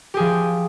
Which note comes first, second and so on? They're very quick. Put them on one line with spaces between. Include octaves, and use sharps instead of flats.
G4 G#4 F3